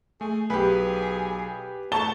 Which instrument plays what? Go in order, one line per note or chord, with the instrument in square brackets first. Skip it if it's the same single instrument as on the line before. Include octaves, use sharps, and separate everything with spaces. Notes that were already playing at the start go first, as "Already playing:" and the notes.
[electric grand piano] A3 [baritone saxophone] G#4
[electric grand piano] B1 [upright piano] G4 B4 [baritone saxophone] G#4
[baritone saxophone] A3 [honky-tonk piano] A5 [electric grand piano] A#5 [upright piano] C#6 G7